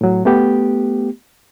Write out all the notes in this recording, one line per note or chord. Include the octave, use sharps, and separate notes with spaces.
A2 F#3
A3 B3 G4